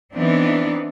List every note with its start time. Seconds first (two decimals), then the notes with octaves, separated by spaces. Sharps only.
0.14 E3 B3 C4 D4 D#4